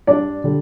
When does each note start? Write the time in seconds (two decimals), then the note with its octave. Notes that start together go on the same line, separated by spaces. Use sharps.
0.07 G2 D4 D5
0.44 D3 G3